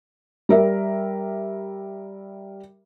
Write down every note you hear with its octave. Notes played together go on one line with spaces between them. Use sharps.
G3 A#4 E5